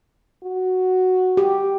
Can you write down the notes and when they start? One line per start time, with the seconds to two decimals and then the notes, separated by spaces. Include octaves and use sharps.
0.43 F#4
1.37 G4